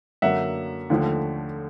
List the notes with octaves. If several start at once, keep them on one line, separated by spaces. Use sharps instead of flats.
F#2 D3 F#3 A#3 E5 F#5
D#2 D3 F3 A3